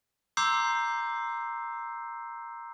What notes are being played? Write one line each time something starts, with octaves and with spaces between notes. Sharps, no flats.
A#5 C6 D6 E6 G6 C7